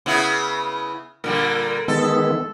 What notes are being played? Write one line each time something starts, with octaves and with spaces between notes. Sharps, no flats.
C#3 B3 E4
A#2 D3 G3 A#4
D#3 G#3 B3 A4